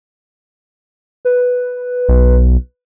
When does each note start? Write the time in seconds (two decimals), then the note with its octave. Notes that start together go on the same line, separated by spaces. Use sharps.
1.25 B4
2.09 B1